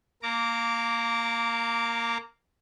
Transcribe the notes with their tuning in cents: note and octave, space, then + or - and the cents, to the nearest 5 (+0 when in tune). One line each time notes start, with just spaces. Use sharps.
A#3 +0 A#5 -25 D6 -20